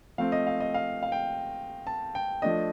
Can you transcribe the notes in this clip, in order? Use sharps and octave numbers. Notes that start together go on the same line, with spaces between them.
F3 A3 C4 F5
D#5
F5
D#5
F5
F5
G5
A5
G5
F3 A3 D4 D#5